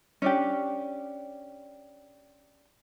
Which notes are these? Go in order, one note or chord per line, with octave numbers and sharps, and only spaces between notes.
C#4 D4 G4